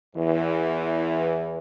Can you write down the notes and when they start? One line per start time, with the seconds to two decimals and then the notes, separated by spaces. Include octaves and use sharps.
0.16 E2 E3